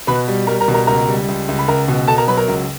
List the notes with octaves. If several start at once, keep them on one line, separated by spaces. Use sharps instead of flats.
B2 B4 B5
G3
G3 A#4 A#5
A#4 A#5
B2
A#4 A#5
C#2 A#4 A#5
G3
C#2
C#2
B5
C#2 A#4 A#5
B2
B2 A4 A5
A#4 A#5
F#3 B4 B5
A#4 A#5
C#2